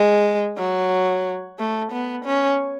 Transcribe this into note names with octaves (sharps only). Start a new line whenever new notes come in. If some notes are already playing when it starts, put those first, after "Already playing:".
Already playing: G#3
F#3
A3
B3
C#4